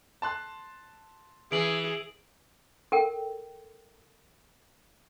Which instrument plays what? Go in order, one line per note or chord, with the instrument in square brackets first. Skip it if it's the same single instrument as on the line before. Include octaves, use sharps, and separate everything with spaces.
[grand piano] A5 C6 F#6
[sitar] E3 [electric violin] G#4 [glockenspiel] D7 F#7
[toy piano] A4 A#4 G5